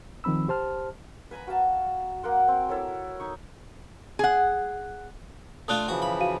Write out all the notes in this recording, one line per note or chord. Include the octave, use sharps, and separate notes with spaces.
D#3 F3 C4 B5 E6
G4 C5 A5 F6
B4 G#5 A#5 B5
F#4 F5 A5 A#5
A#3 A#4 F#5 C6
C4
E4 A4 A#4 C#5
D#4 C#6
G#4 F#5
A3 D4 F4 D#6 F#6
C#3 E3 F3 F#4
B5
F#4 F5 D#7